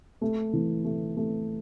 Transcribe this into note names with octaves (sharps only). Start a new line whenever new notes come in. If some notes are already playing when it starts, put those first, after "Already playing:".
A3
E3
A3
A3